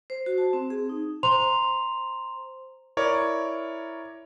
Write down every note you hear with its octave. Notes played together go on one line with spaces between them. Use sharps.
C5
F#4
A5
C4
G#4
D#4
C5 A#5 C6 F7
E4 A#4 C#5 D5